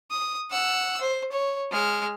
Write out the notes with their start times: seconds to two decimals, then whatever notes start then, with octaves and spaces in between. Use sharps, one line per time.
0.11 D#6
0.51 F#5 E6
1.01 C5
1.32 C#5
1.71 G#3 F6